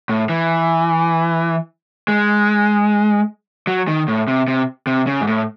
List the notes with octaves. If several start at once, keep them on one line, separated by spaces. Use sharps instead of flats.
A2
E3
G#3
F#3
D#3
A2
C3
C3
C3
C#3
G#2
A2